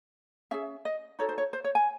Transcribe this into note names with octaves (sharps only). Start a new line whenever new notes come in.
C#4 G#4 E5
D#5
D#4 F#4 A4 C#5
C5
C#5
C5
C#5
G#5